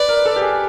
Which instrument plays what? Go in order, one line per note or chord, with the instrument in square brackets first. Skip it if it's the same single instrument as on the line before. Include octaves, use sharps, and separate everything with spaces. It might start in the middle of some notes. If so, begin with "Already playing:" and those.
Already playing: [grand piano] B4 [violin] D5
[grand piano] A#4
A4
G4
G#4